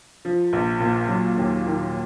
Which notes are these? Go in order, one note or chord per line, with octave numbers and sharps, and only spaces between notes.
F3
A#1
A#2
F#3
D#2
D#3